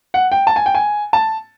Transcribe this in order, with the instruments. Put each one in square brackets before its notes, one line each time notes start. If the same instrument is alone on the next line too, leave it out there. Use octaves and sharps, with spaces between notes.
[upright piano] F#5
G5
A5
G#5
G5
G#5
A5